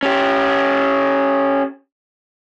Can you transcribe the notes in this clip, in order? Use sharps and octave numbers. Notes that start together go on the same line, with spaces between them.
C#4 G4